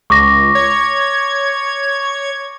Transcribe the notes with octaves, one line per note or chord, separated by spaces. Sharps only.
C#2 C#6 D6 A#6
C#5 G#6